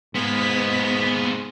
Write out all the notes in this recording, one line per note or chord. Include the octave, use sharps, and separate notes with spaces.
G#2 G#3 A#3 B3 B6